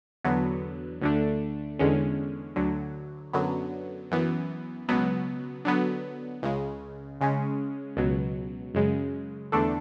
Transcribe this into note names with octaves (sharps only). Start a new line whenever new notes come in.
E2 D3 F#3 B3
D2 D3 A3 D4
E2 D3 G#3 C#4
D2 D3 F#3
F#2 D3 F#3 B3
F#2 E3 B3
C#2 B2 F#3 B3
D3 F#3 B3
C#2 C#3 G#3
C#3 G#3 C#4
C#2 B2 F#3
F#2 C#3 G#3
E2 D3 A3 D4 A4